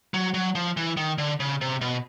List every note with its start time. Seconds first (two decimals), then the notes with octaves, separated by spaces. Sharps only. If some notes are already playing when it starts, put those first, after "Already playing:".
0.14 F#3
0.34 F#3
0.55 F3
0.77 E3
0.97 D#3
1.18 D3
1.40 C#3
1.61 C3
1.81 B2